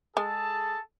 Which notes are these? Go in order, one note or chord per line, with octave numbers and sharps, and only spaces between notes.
G#3 G#4 A4 A5